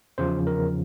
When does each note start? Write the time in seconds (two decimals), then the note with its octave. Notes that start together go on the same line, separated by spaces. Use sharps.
0.18 E2 C#3 F3 C5
0.47 A#4